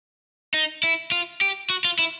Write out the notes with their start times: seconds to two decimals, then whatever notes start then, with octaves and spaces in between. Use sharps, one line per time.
0.54 D#4
0.83 E4
1.11 F4
1.41 G4
1.70 F#4
1.85 F4
1.99 E4